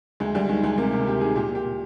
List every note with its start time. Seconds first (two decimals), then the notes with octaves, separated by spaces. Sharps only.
0.20 D2 G#3
0.35 D2 G3
0.49 D#3 G#3
0.63 D2 G#3
0.78 C3 A#3
0.92 C3 A#3
1.07 D2 G4
1.21 D#3 G#4
1.36 A#2 G4
1.50 A#2 G4
1.64 A#2